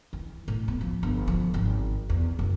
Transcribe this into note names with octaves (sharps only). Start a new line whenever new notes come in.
E3
A2
B3
F3
G1
F3
G#1
E2
F#1